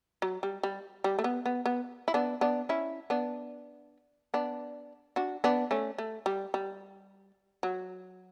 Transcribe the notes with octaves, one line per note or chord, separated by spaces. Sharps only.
F#3
G3
G3
G3
A3
B3
B3
B3
E4
B3 D4
B3 D4
C#4 E4
B3 D4
B3 D4
D4 F#4
B3 D4
A3 C#4
A3
G3
G3
F#3